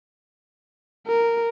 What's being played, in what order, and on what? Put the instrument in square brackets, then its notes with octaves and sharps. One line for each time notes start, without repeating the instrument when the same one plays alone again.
[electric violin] A#4